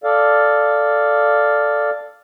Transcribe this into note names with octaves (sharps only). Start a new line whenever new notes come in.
A4 D5 F5